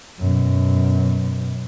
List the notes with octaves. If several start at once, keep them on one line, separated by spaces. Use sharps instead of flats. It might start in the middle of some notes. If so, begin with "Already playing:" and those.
F#2 B2